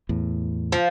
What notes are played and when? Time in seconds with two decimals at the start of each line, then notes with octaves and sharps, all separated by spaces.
0.09 E2 A2
0.72 F3